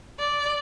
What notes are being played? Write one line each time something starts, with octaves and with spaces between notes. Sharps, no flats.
D5